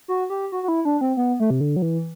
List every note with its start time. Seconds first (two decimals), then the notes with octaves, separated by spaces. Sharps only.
0.08 F#4
0.30 G4
0.52 F#4
0.63 F#4
0.68 E4
0.85 D4
1.01 C4
1.17 B3
1.40 A3
1.50 C3
1.61 D3
1.76 F#3
1.82 E3